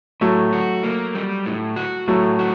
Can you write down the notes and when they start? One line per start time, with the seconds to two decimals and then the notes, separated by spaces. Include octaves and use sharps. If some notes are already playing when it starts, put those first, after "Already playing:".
0.21 A2 F#3 A3
0.53 F#4
0.83 A#3
1.15 G3
1.46 A2
1.76 F#4
2.08 A2 F#3 A3
2.39 F#4